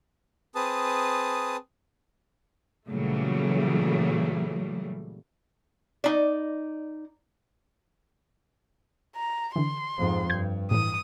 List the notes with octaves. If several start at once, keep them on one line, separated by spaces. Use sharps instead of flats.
C4 G#4 B4 A5 D#6
A#2 C#3 E3 F#3 G3 A3
D#4 D5
A#5
D3 E3 C6
F2 G#2
G2 G6 G#6
A2 E3 D#6